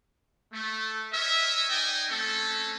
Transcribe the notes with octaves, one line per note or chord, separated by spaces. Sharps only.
A3
A#4 C#5 D#5 E5
D#4 D5 D#5 G5 G#5
A3 C4 C#4 A4